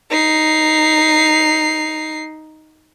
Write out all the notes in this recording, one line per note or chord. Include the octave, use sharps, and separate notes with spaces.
D#4 C7